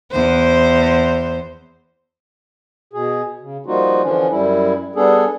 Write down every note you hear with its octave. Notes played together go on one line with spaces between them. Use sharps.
E2 C5
B2 G#4
C#3
F3 G3 A#3 D#4 F4 F#4
D3 E3 F3 C#4 D4
F#2 G3 E4
G3 B3 D4 G#4 A4